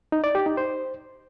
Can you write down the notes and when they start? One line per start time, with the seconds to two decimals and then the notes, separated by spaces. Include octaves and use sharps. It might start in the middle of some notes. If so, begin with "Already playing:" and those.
0.12 D#4
0.24 D5
0.35 G4
0.46 D#4
0.57 C5